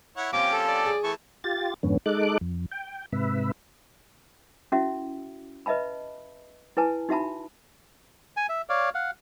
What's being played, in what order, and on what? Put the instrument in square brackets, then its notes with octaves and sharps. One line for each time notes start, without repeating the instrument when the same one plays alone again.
[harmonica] E4 C#5 F#5
[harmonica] F3 C#4 G4 [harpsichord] A#3 C4 [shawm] D6
[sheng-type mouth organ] A4
[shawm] D5
[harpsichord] G#4
[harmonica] E3 A3 A5 [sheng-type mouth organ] C#6
[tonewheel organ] F4 G4 A6
F2 G#2 D3 B3 C#4
G#3 D#4 A4 D6 F#6
F2
G5
G#2 C3 B4 E5
[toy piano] C#4 E4 F#4 E5
B4 D#5 E5 A5 B5
E4 B4 G#5 A5
D#4 F#4 E5 A5 B5
[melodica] G#5
E5
C#5 D5 F5
F5 F#5